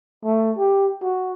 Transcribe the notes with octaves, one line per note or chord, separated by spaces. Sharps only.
A3
G4
F#4